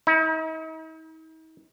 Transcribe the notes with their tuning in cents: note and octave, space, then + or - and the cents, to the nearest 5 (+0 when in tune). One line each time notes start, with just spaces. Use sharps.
D#4 +45